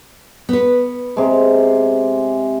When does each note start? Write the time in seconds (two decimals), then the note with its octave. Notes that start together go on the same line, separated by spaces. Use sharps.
0.49 B3 B4
1.17 C3 G#3